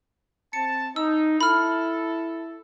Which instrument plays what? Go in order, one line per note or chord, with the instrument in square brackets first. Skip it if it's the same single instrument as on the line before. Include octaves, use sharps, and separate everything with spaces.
[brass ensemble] C4 A5 [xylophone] C#7
[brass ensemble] D#4 [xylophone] E6
[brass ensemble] E4 A4 [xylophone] B5 F6